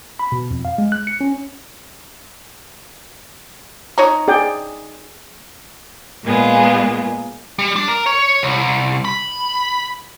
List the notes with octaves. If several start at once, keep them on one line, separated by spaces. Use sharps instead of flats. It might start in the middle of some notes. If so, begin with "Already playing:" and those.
B5
B2
F2
F5
G#3
F#6
C#7
C#4
D#4 C#5 A#5
G#4 D5 G5
A#2 G#3 A#3 B3 F4 G#4
G3
D4
A#4
C#5
C2
B5